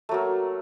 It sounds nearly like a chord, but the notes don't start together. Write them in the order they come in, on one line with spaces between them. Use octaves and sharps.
A3 F#3 A#3